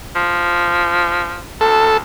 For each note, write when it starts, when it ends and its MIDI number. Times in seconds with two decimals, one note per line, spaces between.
0.15 1.41 53
1.61 2.01 38
1.61 1.97 69